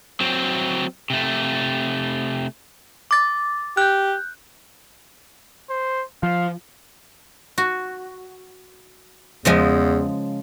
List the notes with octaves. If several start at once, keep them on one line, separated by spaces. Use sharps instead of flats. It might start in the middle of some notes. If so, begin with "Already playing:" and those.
F#3 C4
C3 A3
D6 A6
G4 F#6 G6
C5
F3 F5
F#4
E2 C#3 F3 G#3